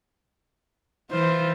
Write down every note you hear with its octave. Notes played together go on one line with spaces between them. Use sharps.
E3 F4 C5